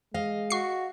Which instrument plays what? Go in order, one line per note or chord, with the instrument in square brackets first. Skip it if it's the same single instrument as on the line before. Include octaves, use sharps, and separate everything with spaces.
[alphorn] G#3 [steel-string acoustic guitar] D#5 F5
[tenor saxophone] F#4 [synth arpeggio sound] C#6 C7